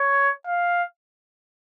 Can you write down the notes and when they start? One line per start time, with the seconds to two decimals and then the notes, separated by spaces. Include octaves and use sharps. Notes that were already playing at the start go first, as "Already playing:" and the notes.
Already playing: C#5
0.46 F5